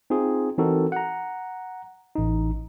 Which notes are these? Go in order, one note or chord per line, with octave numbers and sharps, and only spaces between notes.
C4 D#4 F4 G#4
E3 C4 D#4 F#4 A4 A#4
F#5 A#5
A1 D#4